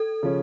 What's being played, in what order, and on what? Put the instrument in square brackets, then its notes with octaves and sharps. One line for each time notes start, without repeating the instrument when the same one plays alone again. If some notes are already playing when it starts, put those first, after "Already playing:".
Already playing: [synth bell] A4
[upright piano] C#3 F3 C#4